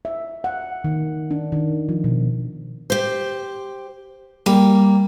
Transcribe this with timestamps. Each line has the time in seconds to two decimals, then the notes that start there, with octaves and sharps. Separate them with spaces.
0.05 E5
0.44 F#5
0.84 D#3
1.31 D4
1.52 D#3
1.89 F3
2.04 B2
2.90 G4 C5
4.46 G3 A#3